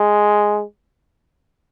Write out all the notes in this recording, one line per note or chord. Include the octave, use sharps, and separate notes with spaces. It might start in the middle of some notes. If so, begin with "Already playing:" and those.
Already playing: G#3